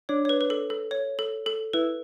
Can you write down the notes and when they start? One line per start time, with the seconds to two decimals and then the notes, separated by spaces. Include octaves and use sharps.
0.09 D4 C#5
0.25 C#5
0.29 B4
0.41 B4
0.50 A4
0.70 A4
0.91 C#5
1.19 A4
1.46 A4
1.73 E4 B4